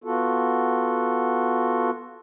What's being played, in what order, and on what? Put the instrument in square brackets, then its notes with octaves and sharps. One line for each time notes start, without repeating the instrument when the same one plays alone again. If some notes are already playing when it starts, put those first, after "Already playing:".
[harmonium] B3 F4 F#4 A4